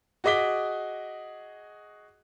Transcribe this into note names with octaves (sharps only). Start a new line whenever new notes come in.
F#4 G#4 D#5 D6 B6 G7